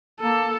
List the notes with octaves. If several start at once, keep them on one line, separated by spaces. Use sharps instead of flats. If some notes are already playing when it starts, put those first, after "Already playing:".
A#3 A4